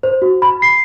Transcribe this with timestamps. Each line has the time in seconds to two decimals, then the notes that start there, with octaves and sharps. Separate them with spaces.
0.03 C5
0.22 F#4
0.42 B5
0.62 C7